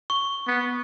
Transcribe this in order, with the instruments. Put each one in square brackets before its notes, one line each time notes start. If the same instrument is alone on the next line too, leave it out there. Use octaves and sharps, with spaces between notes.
[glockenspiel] C#6
[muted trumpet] B3